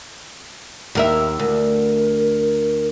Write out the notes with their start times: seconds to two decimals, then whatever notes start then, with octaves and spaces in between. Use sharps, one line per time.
0.95 D#2 A#4 E5
1.39 D2 A#4